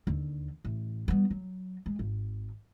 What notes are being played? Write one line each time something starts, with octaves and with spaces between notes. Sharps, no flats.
D#2 D3
A1
G3 B3
F#3
G#3
G#1